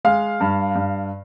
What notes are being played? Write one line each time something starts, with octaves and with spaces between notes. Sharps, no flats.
G#3 F5
G2
G2